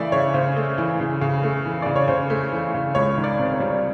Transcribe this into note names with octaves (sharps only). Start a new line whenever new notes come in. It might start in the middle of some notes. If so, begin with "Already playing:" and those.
Already playing: C#3 E3 A3 D5 E5
C#3 C#5
C#3 C5
A3
E3
C#3
C#3
A3
E3
C#3 D5
C#5
C#3 C5
A3
E3
C#3
C#2 C#5
D#3
D5
C3
C#5
G3